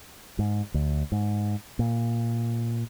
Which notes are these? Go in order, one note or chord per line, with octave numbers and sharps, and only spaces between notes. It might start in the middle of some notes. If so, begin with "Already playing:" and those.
G#2
D2
G#2
A#2